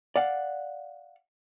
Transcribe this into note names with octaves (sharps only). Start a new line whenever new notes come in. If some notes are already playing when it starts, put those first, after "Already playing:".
D5 F5 F#5